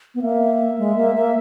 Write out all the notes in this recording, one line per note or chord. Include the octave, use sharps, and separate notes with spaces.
B3
A#3 E5
G#3
A#3
A#3